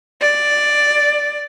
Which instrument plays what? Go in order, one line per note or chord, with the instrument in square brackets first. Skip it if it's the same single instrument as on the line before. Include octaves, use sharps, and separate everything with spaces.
[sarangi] D5